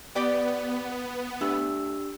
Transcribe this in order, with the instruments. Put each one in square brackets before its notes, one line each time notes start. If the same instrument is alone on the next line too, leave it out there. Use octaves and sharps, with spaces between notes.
[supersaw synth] B3 [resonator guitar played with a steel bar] G4 D5 G5
[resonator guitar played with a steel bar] A3 [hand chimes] D4 G4 E6